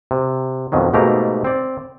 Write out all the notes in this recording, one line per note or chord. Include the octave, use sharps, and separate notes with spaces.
C3
F2 B2 D#3 F#3
G#2 B2 A3 A#3 G4 A#5
C4 D5